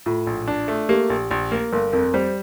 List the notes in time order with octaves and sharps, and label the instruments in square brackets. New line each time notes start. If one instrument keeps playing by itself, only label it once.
[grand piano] A2 [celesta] F4
[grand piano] A#1
D4
A3
[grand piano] A#3 [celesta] G4
[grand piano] A#1
A#1
A#3
[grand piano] G1 [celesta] A#4
[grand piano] F2 [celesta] A#4
[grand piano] G3 [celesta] C5